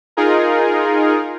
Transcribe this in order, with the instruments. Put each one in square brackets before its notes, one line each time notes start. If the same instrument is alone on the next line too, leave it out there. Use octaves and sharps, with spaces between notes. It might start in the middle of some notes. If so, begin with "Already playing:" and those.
[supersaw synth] D#4 F4 G#4 A#4